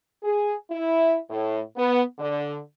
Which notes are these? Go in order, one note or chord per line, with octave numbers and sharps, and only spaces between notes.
G#4
E4
A2
B3
D3